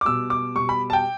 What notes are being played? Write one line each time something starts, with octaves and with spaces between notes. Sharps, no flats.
D6
B2 G3 E6
D6
B2 G3 C#6
B5
A5
G5